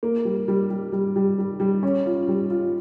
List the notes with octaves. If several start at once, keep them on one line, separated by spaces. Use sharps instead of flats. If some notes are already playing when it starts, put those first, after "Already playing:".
A#3
G3
G3
G3
G3
G3
G3
G3
C#4
F4
G3
F4